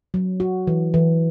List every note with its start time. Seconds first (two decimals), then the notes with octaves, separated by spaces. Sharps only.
0.14 F#3
0.40 F#4
0.67 E3
0.94 E3